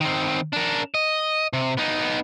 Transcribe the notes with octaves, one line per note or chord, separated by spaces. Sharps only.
D#3 C4
D4 A#4
D#5
C3
B3 D#4